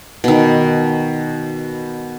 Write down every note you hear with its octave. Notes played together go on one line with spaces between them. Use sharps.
B2 D#3